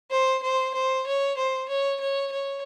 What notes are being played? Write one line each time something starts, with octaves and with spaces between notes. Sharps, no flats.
C5
C5
C5
C#5
C5
C#5
C#5
C#5